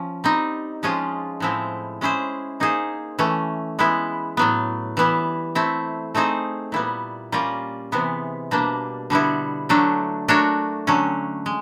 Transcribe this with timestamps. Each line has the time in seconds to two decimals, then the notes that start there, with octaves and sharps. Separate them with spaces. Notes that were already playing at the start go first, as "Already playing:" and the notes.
Already playing: F3 C#4
0.24 G3 C4 D#4
0.83 F3 G#3 C#4 F4 G#4
1.40 A2 F3 G#3 C4 E4
2.01 G#3 C#4 E4 G#4 C5
2.60 A#3 D#4 G#4 C5
3.19 E3 A3 C#4
3.79 G#3 B3 E4
4.37 A2 F#3 B3
4.97 E3 G3 B3 E4
5.55 A3 C4 E4
6.15 A3 C4 D#4 G#4 C5
6.72 A#2 G3 B3 E4
7.32 G3 A#3 C#4 F4 A#4
7.92 C3 E3 G#3 B3
8.51 B2 G3 A#3 D4
9.10 D3 G3 B3 E4
9.69 D3 F#3 A3 D4
10.28 A3 D4 F#4 A#4 C#5
10.87 D3 F#3 A3 C#4
11.46 G#3